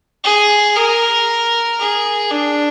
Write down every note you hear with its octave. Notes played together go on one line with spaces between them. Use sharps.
G#4
A#4
G#4
D4